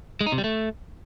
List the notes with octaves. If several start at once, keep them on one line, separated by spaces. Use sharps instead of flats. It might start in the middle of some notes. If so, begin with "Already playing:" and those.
G#3
D#4
C3
G3
A3